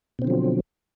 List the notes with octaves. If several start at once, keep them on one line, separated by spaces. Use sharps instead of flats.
B2 D3 F3 F#3 C4